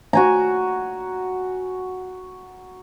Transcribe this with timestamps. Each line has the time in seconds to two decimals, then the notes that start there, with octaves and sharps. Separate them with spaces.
0.13 F#4 G#5 A#5